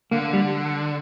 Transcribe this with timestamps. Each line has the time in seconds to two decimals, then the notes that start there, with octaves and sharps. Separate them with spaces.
0.12 D3 A#3
0.33 G3